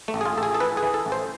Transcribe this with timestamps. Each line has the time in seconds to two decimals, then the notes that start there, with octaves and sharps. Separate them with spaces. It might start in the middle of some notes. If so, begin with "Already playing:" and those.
0.08 A3
0.14 A1
0.21 G#4
0.25 F4
0.37 A1 A4
0.43 G#4
0.54 A4
0.60 E3 B4
0.77 G#4
0.83 E3
0.94 A4
1.06 A1
1.12 C5